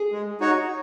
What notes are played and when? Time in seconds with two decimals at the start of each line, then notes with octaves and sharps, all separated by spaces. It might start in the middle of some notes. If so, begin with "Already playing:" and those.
Already playing: G#4
0.12 G#3
0.40 D#4 F#4 C#5